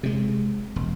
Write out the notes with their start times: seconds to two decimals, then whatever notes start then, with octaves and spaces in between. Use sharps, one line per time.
0.03 C3 G#3
0.76 E1